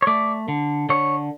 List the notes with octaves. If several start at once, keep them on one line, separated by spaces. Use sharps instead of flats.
C#5
A3 D5
D3
D3 C#5